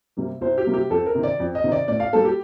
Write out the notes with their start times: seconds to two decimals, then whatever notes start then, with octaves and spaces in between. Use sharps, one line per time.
0.17 C3 G3 A#3
0.41 C2 C5
0.58 G4
0.66 C3 G3 A#3
0.74 G4
0.90 F2 A4
1.06 A#4
1.15 C3 D#3
1.23 D5
1.40 F2
1.55 D#5
1.64 C3 D#3
1.72 D5
1.88 A2 D5
2.00 F5
2.13 G3 A#3 A4
2.25 G4